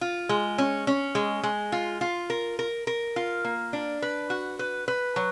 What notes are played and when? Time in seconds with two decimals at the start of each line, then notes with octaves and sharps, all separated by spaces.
0.01 F4
0.29 G#3
0.58 C#4
0.87 C#4
1.15 G#3
1.43 G#3
1.72 F4
2.01 F4
2.30 A#4
2.59 A#4
2.87 A#4
3.16 F4
3.45 A#3
3.73 D4
4.02 B4
4.30 F#4
4.59 B4
4.88 B4
5.16 F#3